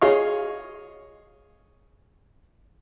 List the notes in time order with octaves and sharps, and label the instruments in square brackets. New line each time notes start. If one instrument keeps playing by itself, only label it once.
[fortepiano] G#4 C#5 D#5 F5 C#6